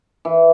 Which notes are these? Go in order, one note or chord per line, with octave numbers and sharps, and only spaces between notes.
E3